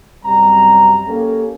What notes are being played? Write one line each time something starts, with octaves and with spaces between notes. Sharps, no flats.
F#2 C3 G3 A#5
A#3 C#4 G4 A4